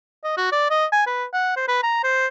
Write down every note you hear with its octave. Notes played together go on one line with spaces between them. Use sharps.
D#5
F#4
D5
D#5
G#5
B4
F#5
C5
B4
A#5
C5